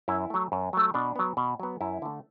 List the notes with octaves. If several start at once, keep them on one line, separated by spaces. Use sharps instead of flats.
F#2 E4
F#3 A3
F#2
F#3 A3
B2 D4
F#3 B3
B2
F#3 B3
F#2 E4
D3 A3